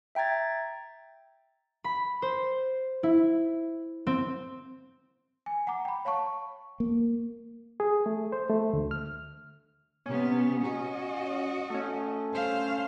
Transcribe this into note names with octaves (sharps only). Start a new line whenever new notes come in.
E5 G5 A#5 G#6 A6
B5
C5
E4
C4
G#5
F#5 A#5 D6
G5 B5
C#5 F5 A5 C#6
A#3
G#4
A3
C5
A3
D2
F6
C3 B3 C#4
F#4 D#5
A3 C#4
C5 F5